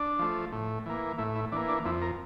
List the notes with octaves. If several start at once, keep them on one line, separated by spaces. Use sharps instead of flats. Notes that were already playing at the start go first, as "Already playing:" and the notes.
Already playing: D4
F3 A3
A2
E3 A#3
A2 E4
E4
E3 A#3 D4
D4
F2 E4
A#4